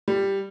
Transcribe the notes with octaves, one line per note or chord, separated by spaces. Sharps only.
G3